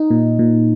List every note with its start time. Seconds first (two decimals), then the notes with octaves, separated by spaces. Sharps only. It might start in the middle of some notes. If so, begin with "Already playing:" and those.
Already playing: D#4
0.11 A#2
0.39 A#2